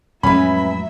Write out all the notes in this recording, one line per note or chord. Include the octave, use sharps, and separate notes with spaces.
F2 A2 F#3 G#3 C#4 B4 E5 B5